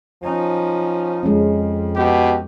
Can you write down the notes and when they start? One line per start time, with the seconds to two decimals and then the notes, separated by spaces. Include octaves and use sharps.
0.23 F3 C#4 D#4
1.23 F2 G#3 C#4
1.96 B2 G4